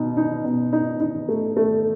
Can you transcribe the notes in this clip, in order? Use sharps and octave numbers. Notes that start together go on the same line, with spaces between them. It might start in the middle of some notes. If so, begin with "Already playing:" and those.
Already playing: B2 D#4
D#4
B2
D#4
D#4
A3
A3